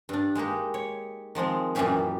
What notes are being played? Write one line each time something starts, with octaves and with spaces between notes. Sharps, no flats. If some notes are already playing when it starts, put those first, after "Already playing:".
G2 D4
G#3 A#3 D#4 G4
C#5
D#3 F3 G#3 C4
F#2 A#2 E3 C#4 G4 G#4